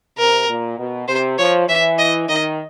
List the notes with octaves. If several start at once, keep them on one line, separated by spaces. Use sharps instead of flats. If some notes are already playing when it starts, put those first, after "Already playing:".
C3 A#4
A#2
B2
C3 C5
F3 C#5
E3 E5
D#5
D#3 D#5